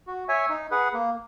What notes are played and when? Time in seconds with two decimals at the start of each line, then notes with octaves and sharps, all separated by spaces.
0.07 F#4
0.28 C#5 E5 G#5
0.50 D#4
0.71 G#4 B4 F#5
0.93 A#3